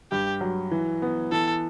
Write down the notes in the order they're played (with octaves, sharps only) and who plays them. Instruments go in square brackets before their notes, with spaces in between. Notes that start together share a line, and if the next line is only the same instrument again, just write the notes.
[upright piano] G2 [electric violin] G4
[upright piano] F#3
E3
B3
[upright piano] E3 [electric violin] A4